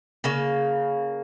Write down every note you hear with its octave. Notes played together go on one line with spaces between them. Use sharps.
C#3 A#3